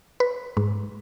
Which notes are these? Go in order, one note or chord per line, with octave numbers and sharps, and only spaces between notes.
B4
G#2